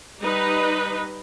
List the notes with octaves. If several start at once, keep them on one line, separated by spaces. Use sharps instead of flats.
G3 D#4 B4 D#5